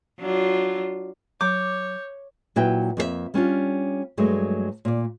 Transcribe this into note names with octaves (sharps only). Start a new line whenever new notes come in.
F#3 D4 F4
F#3 C#5 D6 G6
A#2 F#3 E4 F#4 B4 G5
F2 A#3 A4 E5
G3 C#4 D4 F4
G2 F#3 G#3 A3
A#2 D5